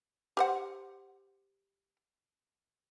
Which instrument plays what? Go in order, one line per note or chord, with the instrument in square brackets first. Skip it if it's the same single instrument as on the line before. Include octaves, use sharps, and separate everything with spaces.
[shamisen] G4 C5 F#5